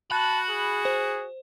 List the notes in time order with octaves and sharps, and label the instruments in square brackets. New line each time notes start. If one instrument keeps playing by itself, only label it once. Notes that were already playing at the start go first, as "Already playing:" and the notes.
[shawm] F#4 [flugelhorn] A5 [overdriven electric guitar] B5 [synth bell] F#6
[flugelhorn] G#4
[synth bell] C5